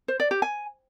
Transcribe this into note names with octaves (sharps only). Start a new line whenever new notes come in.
C5
D5
G4
G#5